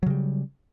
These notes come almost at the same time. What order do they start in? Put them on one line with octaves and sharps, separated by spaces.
F#3 C#3 G3